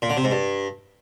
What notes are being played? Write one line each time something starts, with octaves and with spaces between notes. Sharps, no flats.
A#2
D3
C3
G#2
G2